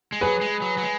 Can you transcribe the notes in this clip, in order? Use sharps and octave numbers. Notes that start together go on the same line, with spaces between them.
G#3
F#3 G#4 B4
G#3
F#3
F#3
G#3